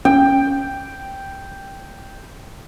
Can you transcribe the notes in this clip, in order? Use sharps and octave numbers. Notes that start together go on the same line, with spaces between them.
C#4 G5